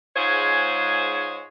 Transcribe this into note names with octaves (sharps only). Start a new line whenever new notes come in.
G#2 G#3 F4 G#4 C5 C#5